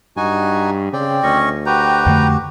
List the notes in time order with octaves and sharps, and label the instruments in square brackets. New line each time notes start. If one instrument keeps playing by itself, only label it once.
[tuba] G2 [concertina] D#4 F#4 G#5
[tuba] C#3 [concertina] C4 D5 G5
[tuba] D2 [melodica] C#4 D#5 C#6
[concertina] F#4 G4 [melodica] B4 G5 A#5
[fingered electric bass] F2 D3 A3